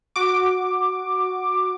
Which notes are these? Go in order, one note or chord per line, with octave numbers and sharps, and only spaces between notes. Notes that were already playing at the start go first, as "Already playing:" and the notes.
F#4 D6